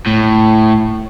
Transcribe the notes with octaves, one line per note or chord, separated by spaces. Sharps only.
A2